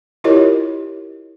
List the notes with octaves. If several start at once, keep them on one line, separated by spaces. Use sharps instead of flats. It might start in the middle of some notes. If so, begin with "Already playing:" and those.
E4 F4 G4 A#4 C#5 D#5